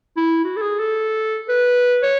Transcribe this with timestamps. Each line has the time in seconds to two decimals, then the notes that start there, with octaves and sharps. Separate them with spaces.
0.17 E4
0.44 F#4
0.57 A4
0.62 G#4
0.79 A4
1.49 B4
2.03 C#5